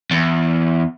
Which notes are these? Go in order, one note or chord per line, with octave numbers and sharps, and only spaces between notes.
E2